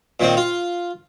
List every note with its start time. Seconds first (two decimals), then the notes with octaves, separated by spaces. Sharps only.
0.20 A#2 D#3 C4
0.37 F4